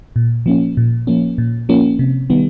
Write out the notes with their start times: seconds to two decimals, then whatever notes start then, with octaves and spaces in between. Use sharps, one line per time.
0.16 A#2
0.46 F3 A#3 C#4
0.77 A#2
1.07 F3 A#3 C#4
1.38 A#2
1.69 F3 A#3 C#4
1.99 C3
2.30 D#3 G3 B3